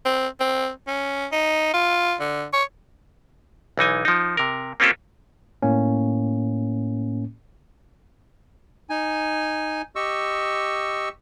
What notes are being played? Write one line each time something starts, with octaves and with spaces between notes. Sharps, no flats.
C4
C4
C#4
D#4
F4
D3
C#5
B1 E3 D#4 G#5
F3 D#4
C3 A#4
A#3 C4 C#4 F4 G4 A4
A2 A#3 C#4
D#4 G#5
G4 D#5 C#6 E6